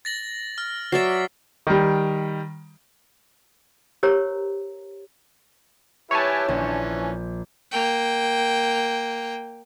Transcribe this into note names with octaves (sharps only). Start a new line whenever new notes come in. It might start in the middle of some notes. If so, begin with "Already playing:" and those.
A6 A#6 F#7
F6
F#3 D5 E5 A6 C7
D#3 G3
G4 A#4 C5 C#5 A#5
E4 G4 B4 C#5 G#5 A5
A#1 E3 C#4
A#3 G5